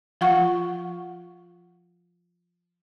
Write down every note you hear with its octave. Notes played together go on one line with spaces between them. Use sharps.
F3 F4 F#5 C#6